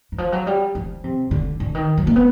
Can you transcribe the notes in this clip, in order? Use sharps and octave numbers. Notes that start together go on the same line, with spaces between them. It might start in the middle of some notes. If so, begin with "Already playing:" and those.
E3
F3
F#3
G3
F3
C3
D3
D3
D#3
F#3
A#3
B3